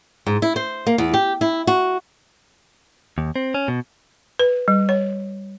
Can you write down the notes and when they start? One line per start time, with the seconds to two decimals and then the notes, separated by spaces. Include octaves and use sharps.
0.27 G#2
0.42 E4
0.56 C5
0.86 A#3
0.98 E2
1.14 G4
1.41 E4
1.67 F#4
3.18 D#2
3.36 C4
3.54 C#4
3.68 B2
4.39 B4
4.68 G3
4.89 C#5